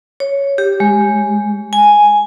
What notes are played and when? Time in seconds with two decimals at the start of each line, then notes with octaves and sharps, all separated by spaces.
0.20 C#5
0.58 G4
0.80 G#3
1.73 G#5